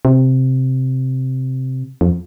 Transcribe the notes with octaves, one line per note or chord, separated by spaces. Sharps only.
C3
F2